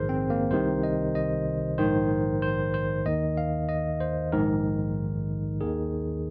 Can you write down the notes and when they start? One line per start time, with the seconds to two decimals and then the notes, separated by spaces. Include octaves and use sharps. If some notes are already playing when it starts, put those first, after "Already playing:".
Already playing: A#1 G#2 D#3 G#4 A#4 C5
0.09 C4
0.30 A#3
0.51 C2 C3 D#3 C5
0.83 D#5
1.15 D#5
1.78 A#1 G#2 D#3 C5
2.42 C5
2.74 C5
3.06 D#2 D#3 D#5
3.37 F5
3.69 D#5
4.00 C5
4.32 A#1 G#2 D#3 A#4
5.61 D#2 D#3 G#4